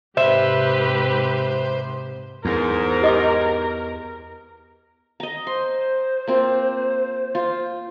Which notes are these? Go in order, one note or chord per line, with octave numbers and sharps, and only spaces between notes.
G#2 C3 G4 B4 C5 E5
E2 G#2 A#4
G4 D#5 D6
D#5 A#5
C5 C6
A#3 C4 F4
F4